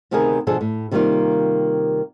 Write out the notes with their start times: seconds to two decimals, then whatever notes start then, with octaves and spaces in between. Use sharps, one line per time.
0.11 D2 C3 D#3 B3 G#4 A#4
0.47 B2 D3 F3 G#4 A4
0.61 A2
0.91 C3 D#3 G3 A3 A#3 F4